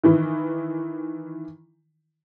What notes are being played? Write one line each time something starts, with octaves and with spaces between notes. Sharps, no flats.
D#3 E3 E4